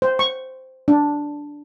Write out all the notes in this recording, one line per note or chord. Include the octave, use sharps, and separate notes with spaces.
C5
C#6
D4